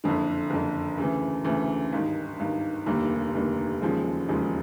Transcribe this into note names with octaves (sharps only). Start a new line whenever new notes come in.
F#1 F2 D3
F#1 F2 D3
D2 C#3 E3
D2 C#3 E3
G#1 G2 D#3
G#1 G2 D#3
F1 D#2 D3 G3 A#3
F1 D#2 D3 G3 A#3
E1 D#2 C#3 F3 G#3
E1 D#2 C#3 F3 G#3